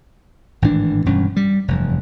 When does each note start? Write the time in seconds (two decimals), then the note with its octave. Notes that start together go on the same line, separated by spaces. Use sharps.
0.62 G#1 A2 E3 D4
1.06 E1 G2 C#4
1.36 G3
1.68 F1 E2 G2